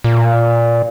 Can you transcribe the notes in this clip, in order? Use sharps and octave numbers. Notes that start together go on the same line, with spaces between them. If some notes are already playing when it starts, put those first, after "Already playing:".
A#2